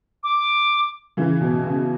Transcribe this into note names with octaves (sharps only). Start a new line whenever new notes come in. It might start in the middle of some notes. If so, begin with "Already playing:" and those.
D6
C#3 E3
B2
C#3